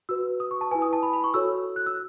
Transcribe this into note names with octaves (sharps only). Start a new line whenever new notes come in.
F#4 B4 E6
D#6
C#6
A5
E4 B4 G#5
D#6
A5
B5
B5
C#6
F#4 A4 C#5 E6
F#6
E6